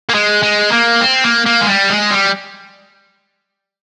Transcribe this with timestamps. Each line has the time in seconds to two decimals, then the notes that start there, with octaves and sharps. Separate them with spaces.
0.09 A#3
0.15 G#3
0.43 G#3
0.73 A#3
1.01 C4
1.24 A#3
1.46 A#3
1.61 G#3
1.68 G3
1.90 G#3
2.11 G3